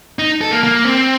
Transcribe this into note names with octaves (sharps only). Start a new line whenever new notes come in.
D#4
A4
A#3
A#3
C4